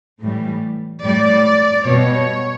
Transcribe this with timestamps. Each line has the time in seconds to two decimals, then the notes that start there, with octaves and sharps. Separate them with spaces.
0.19 A2 E3 G3
1.03 A2 G3 D5
1.86 B2 G3 C#5